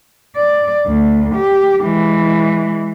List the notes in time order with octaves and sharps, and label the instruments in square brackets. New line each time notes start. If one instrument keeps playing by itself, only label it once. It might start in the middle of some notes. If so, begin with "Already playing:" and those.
[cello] D5
D2
G4
E3 G#3